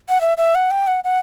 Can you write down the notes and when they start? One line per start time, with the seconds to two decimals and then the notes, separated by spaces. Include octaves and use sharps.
0.09 F#5
0.21 E5
0.37 E5
0.55 F#5
0.71 G5
0.87 F#5
1.04 F#5